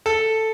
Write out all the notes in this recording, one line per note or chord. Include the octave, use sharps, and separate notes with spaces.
A4